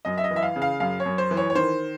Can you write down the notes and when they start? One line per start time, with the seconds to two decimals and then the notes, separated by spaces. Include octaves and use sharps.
0.05 F#2 D#5
0.18 E5
0.24 D#5
0.31 E3
0.36 E5
0.43 F5
0.56 C#3
0.62 F5
0.80 F#2 F5
1.00 C#5
1.06 F#2
1.18 C5
1.31 E3
1.37 C#5
1.50 C#5
1.55 D#3 C5